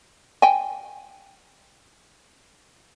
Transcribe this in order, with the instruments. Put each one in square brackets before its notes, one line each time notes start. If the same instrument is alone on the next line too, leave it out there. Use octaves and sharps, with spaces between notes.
[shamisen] G5 G#5